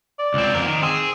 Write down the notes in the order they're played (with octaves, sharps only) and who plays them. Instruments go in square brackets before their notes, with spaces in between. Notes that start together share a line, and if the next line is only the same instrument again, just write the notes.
[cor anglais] D5
[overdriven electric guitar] C#2 C4
F2 A#4
D#3
[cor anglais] C4 [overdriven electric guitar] G#4